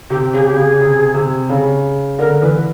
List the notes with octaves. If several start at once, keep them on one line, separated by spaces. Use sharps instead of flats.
C3 G4
C#3 G#4
G4
C#3 G#4
C3
C3
C#3
D3 A#4
E3 B4